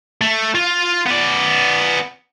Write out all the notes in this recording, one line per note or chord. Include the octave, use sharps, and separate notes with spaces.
A3
F4
B3 D5